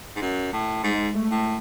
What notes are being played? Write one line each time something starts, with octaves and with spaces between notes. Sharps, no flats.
G#2
F#2
A2
G#2 G#3
A3
A2